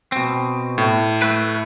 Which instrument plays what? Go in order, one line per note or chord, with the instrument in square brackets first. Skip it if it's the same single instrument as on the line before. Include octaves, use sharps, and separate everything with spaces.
[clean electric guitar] B2 C4
[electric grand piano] A2
[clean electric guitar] A3 B4